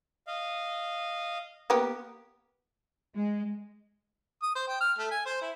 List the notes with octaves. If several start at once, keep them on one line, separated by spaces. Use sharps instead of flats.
D#5 F5
A#3 B3 G4
G#3
D#6
C5
G5
F6
A3
G#5
C5
E4